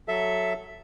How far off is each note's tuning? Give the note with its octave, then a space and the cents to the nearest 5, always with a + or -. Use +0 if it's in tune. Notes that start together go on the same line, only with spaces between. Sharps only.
F#3 +0 A4 +0 E5 +0